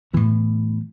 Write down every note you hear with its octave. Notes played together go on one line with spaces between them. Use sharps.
A2 E3 B3